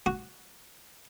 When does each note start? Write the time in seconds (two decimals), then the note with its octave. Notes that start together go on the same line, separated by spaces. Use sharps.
0.06 F#4